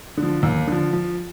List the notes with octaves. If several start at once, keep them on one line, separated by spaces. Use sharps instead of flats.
D3
F3
D#2
D3 F3
F3